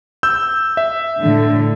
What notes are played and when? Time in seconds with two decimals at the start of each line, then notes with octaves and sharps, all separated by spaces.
0.23 E6 G6
0.77 E5
1.22 A2 D3